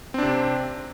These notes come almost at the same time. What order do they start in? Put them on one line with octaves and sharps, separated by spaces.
C4 D4 C3